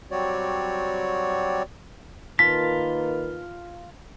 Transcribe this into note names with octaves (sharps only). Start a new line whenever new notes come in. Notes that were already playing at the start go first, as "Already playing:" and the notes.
F#3 G3 C4 F#4 C#5 D5
D#3 A#3 F4 B4 A5 B6